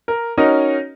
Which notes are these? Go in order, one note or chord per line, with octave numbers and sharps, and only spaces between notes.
A#4
C#4 D#4 F#4 A#4 D#5